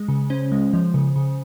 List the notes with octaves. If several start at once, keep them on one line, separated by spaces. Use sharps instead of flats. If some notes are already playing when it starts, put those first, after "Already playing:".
Already playing: G#3
C#3
C#4 C5
G#3
F3
C#3
C#3